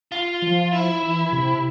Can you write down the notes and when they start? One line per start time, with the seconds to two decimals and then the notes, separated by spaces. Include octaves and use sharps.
0.12 F4
0.42 F3
0.72 E4
1.03 E3
1.33 C3